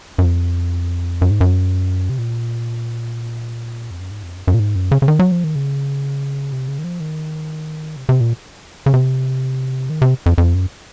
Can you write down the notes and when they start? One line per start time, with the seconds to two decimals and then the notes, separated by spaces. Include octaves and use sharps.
0.18 F#2
0.25 F2
1.22 F#2
1.31 G#2
1.41 F#2
2.10 C3
2.18 A#2
3.91 F2
4.01 F#2
4.11 G#2
4.23 F2
4.36 F#2
4.47 F#2
4.54 A#2
4.59 G#2
4.75 F#2
4.92 C#3
5.02 C#3
5.08 D#3
5.19 F#3
5.32 F3
5.44 D#3
5.55 C#3
6.52 C3
6.68 C#3
6.79 D#3
6.84 F3
7.00 D#3
7.97 C3
8.09 C3
8.20 A#2
8.86 C#3
8.94 C3
9.90 D#3
10.02 C3
10.26 F2
10.38 F2
10.54 F#2